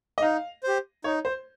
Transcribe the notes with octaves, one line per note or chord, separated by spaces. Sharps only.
D#5
D#4 F5
G4 C5
D#4 C#5
C5